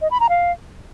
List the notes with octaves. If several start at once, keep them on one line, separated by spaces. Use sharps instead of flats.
D#5
B5
A#5
F5